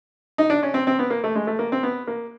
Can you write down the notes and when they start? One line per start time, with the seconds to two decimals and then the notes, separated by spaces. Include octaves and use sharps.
0.38 D#4
0.50 D4
0.63 C#4
0.74 C4
0.87 C4
0.99 B3
1.10 A#3
1.24 A3
1.35 G#3
1.47 A3
1.59 A#3
1.72 C4
1.83 B3
2.07 A#3